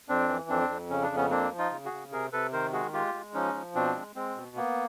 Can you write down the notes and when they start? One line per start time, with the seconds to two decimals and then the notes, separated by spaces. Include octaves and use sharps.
0.09 F2 C4 D4
0.29 E3
0.49 F2 C4 D4
0.69 F2
0.90 C#3 C#4
1.03 D4
1.10 F2
1.16 B3 C#4
1.31 A#3 C4 D4
1.51 F3
1.58 D#4 F4
1.71 C#3
1.85 F#4 G#4
1.92 C#3
2.12 C3 G#4 A#4
2.33 C3 A4 B4
2.53 D#3 A#4 C5
2.73 G#3 F#4 G#4
2.93 G#3 F4 G4
3.14 G#3
3.34 F3 C#4 D#4
3.54 F3
3.75 B2 C4 D4
3.95 G#3
4.16 G#3 C4
4.36 B2
4.56 A#3 B3